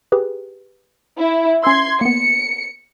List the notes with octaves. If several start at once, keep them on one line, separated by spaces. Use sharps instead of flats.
G4 G#4 B4
E4
C#4 C6 E6 G#6 C7
A#3 B3 C#7